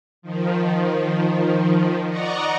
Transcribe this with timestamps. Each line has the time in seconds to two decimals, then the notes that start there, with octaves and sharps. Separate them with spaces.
0.22 D#3 F3
2.07 D5 D#5 F#5 A#5 C#6